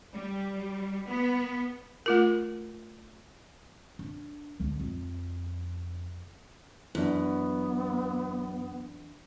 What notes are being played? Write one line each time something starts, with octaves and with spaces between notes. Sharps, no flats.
G3
B3
A3 F4 A#4
D4
D2
F2
F#2 E3 B3 D4